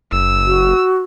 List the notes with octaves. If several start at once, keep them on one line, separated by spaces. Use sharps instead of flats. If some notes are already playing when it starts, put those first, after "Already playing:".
F#1 E6
F#4